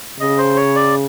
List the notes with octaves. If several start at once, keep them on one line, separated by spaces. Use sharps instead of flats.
C#3 D#5
C5
C#5
D5